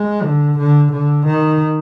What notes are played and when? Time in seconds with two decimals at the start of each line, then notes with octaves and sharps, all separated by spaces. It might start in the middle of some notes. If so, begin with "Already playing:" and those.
Already playing: G#3
0.23 D3
0.58 D3
0.92 D3
1.26 D#3